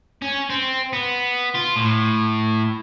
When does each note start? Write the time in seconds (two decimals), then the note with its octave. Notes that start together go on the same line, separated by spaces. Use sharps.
0.22 C#4
0.50 C4
0.93 B3
1.55 F4
1.76 A2